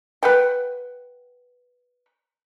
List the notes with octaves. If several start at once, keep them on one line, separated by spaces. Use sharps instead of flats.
B4 F#5 G5